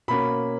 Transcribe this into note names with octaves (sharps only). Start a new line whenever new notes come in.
B2 A#3 C#4 B5